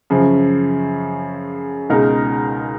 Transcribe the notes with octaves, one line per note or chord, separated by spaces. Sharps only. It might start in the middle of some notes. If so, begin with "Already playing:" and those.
F#2 C#3 F3
C#2 B2 G#3 D#4 A#4